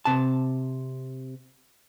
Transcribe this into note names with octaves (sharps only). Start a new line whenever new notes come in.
C3 A5